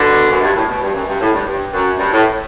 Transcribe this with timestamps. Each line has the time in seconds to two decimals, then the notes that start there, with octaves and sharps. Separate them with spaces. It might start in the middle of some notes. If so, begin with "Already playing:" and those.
Already playing: B2 D3
0.32 F#2
0.43 G2
0.56 A2
0.69 B2
0.82 G2
0.94 F#2
1.08 G2
1.21 A2
1.34 G2
1.46 G2
1.73 F#2
1.99 G2
2.12 A2